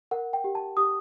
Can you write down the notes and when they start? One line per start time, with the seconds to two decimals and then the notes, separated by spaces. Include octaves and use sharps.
0.11 A#4 F#5
0.33 G5
0.44 G4
0.55 A5
0.77 G4 D#6